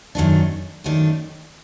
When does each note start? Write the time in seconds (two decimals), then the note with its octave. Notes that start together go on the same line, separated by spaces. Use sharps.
0.15 F#2 D#3 A3 D4
0.84 F#2 D#3 A3 D4